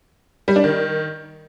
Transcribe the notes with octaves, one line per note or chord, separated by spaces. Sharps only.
G3
D4
D#3